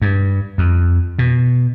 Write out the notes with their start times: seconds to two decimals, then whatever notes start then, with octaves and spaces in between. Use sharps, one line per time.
0.02 G2
0.58 F2
1.19 B2